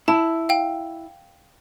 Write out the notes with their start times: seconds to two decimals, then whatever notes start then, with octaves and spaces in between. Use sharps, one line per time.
0.08 E4 A5
0.49 F5 G5